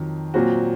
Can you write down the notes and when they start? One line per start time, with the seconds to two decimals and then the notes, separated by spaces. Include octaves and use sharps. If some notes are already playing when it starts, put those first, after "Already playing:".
Already playing: F2 D#3 F#3
0.34 A#2 F#3 C4 F#4